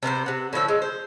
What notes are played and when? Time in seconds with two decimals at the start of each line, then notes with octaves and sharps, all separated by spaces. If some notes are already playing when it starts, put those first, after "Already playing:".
0.03 C3 B3 A#4 C5
0.26 C3 F#5
0.53 A2 D3 F3 E5
0.68 G#3
0.82 C5